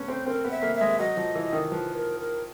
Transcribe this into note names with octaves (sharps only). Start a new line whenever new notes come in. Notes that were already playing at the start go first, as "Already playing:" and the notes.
Already playing: A3 B3 C#4
C4 C5
C4 A#4
B3
E5
A#3
E5
G#3
F#3 D#5
F3
E3
D#3
F3 B4
A#4
A#4